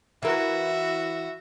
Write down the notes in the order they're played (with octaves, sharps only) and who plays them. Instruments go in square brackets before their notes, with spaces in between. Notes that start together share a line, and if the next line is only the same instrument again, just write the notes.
[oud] E3 A#4 [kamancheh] F#4 E5